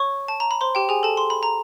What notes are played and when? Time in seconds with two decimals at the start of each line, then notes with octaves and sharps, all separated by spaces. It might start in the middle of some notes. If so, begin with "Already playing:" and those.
Already playing: C#5 C#6
0.28 A5
0.40 A#5
0.51 B5
0.61 C5 C6
0.75 G4 G5
0.89 G#4 G#5
1.03 A4 A5
1.17 C6
1.30 B5
1.43 A#5